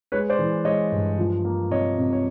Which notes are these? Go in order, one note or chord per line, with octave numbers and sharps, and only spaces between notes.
G#3 B4 C#5
C5 D5
E3
G#3 C#5 D#5
G2
F3
A#3
C3 C#5 D#5
C3
C#5